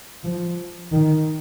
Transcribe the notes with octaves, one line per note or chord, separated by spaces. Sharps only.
F3
D#3